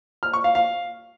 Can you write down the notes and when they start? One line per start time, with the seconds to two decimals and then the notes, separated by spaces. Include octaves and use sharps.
0.23 F6
0.33 C#6
0.44 F5
0.55 F5